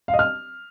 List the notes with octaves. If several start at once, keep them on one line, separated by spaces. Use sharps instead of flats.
F5
D#5
F6